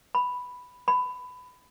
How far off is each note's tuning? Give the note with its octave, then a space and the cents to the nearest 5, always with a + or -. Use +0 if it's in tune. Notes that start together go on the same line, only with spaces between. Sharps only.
B5 +5
B5 +20